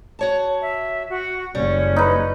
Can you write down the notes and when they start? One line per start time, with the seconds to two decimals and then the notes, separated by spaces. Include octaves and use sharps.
0.19 F#4 C#5 A5
0.61 E5
1.10 F#4
1.55 F#1 G3 C#4
1.96 D#4 B4